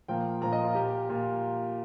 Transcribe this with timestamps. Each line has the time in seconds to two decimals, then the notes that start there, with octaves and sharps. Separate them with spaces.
0.08 A#2 F3 A#3 G5
0.41 A#2 F3 A#3 A#5
0.53 D#5
0.64 F4
0.71 A#4
0.75 A#2 A#3 G4
1.09 A#2 A#3 F4